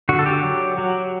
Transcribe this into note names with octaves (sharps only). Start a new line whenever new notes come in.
D3 F#4
A4
G4
F#3
F#3